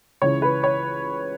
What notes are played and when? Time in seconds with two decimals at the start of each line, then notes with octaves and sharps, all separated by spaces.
0.22 C#2 C#3 E3 C#5
0.42 B4
0.63 C#5